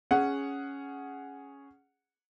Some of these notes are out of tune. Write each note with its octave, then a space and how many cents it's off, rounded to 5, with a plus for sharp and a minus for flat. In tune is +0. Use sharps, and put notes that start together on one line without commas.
C#4 +0 G#4 +0 F#5 +0